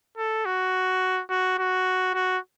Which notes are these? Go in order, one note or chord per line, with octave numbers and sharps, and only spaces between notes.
A4
F#4
F#4
F#4
F#4